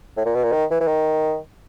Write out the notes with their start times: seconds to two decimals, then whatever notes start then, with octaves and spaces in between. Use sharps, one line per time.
0.17 A2
0.26 A#2
0.35 B2
0.44 A#2
0.52 D#3
0.70 E3
0.80 E3
0.88 D#3